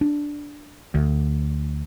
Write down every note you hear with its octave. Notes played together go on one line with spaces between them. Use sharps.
D4
D2